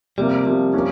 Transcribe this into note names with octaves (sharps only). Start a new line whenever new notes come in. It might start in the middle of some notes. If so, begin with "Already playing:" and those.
C3 F3 G3 A#3
C3 F3 A#3
F3 A#3 C#4